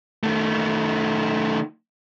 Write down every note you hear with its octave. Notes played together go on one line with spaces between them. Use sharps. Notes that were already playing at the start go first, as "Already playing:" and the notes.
D#3 A3